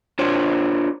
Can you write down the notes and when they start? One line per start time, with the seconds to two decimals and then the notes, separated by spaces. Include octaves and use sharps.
0.19 D4 F4 C5 C#5